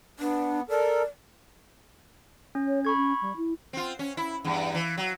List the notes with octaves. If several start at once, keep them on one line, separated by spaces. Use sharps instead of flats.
B3 D4
A4 A#4 D5
C#4
C#5
A4 B5 C#6 G#6
C#4
G3
E4
C4 F4
C#4
E4
E2 G2
E3
F#3